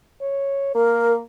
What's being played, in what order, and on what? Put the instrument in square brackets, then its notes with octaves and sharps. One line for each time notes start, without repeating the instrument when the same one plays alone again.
[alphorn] C#5
[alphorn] A#3 [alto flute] A#4